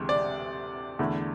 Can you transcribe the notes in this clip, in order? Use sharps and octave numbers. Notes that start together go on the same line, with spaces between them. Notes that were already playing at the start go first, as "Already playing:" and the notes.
Already playing: D2 C3 E3 G#3
D5
E2 D3 A3 E4